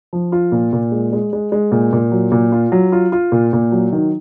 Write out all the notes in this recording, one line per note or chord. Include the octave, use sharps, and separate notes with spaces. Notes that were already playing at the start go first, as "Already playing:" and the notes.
F3
F4
A#2
A#2
G#3
G#3
G#3
G#3
A#2
A#2
F#3
A#2
F4
F#3
F4
F4
A#2
A#2
F#3
D#3